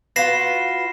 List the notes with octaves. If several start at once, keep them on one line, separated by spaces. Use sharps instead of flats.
F4 F#4 B4 A#6 C7 E7